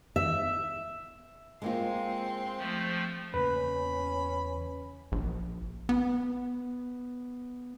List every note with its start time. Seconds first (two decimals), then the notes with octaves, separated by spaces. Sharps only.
0.16 E5
1.62 G#3 A#3 C4 F4 C6
2.58 F3 A3
3.34 E2 C#3 A#3 C#4 B4 B5
5.12 A#1
5.89 B3